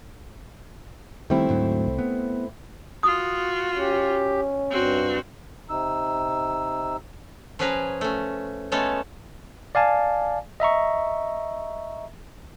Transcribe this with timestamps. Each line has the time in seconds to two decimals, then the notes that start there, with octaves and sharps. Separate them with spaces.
1.30 D#3 G3 A3 C4 E4
1.49 D2 G#2 F#3
1.87 C2
1.99 B3
3.03 F4 F#4 D#6
3.77 C#4 G4
4.71 G2 C4 F#4
5.69 C3 D#4 E6
7.59 F3 C#4 G#4 B4 G#5 A#5
8.01 A3 C#4
8.72 G#3 A3 B3 C#4 A4 C#5
9.75 D5 F5 G#5 A5
10.60 D#5 E5 A#5 C#6